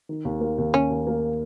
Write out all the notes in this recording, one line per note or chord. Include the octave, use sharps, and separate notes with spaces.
D#3
D#2
A#3
D#2
D#2 C#4
D#2
A#3